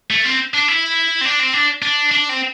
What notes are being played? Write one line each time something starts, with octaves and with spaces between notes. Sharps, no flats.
A3
C4
D4
E4
C4
D4
C4
D4
D4
D4
C4